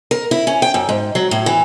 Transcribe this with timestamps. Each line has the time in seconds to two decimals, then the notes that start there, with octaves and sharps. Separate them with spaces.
0.11 A#4
0.31 E4
0.47 C#4
0.62 G5
0.74 F#2
0.89 G#2
1.15 F#3
1.31 A2
1.46 E3